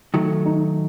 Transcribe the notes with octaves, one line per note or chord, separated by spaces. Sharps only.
D#3 F#3 A3
D#4